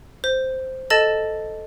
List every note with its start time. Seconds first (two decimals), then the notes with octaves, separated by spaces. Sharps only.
0.24 C5
0.90 A4 D#5 A5 A6 E7